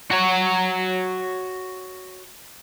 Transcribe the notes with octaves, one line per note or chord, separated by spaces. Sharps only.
F#4 C#5